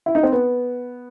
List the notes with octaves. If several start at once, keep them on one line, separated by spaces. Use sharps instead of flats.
E4
D#4
C4
B3